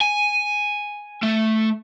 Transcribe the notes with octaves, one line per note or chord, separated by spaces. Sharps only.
G#5
A3